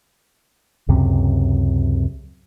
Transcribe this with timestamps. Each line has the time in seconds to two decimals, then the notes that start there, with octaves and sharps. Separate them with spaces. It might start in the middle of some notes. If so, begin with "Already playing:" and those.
0.89 C#2 F#2 C3